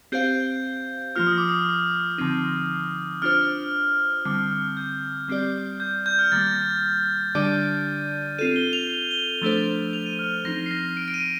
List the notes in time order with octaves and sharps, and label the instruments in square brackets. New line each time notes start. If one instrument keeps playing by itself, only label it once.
[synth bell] C4 G4 C5 F5 [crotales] G6
[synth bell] F3 A#3 F4 [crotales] F6
[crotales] D#6
D6
D#6
[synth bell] D3 F3 C4 D#4
[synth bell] D4 F4 C5 [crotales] F6
[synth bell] D3 G3 C4 [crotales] F6
[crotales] F6
G6
[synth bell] G3 C4 G4 D5
[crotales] G6
G6
F6
[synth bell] D#3 G3 A#3 [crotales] A6
[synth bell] D3 G3 D4 G4 D5 [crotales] D#7
[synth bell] C4 F4 A4 [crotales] D#7
[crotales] G7
F7
G7
G7
[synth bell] F3 A3 D4 A4 C5
[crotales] F7
D#7
F6
[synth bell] F3 C4 D#4 [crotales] A#6
[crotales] C7
A#6
D7
D7
D#7